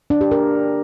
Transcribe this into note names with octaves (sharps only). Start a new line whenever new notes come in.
D4
G4
A#4